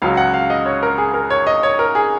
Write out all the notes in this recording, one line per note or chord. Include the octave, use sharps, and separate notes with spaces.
C#2 C#3 F#3 F5
F#5
F5
D#5
C#5
A#4
G#4
A#4
C#5
D#5
C#5
A#4
G#4